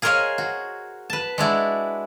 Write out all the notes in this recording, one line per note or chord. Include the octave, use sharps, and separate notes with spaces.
G#4 A#4 C5 C#5 D#5 F5
F#4
B4 A5
G#3 D4 E4 F#4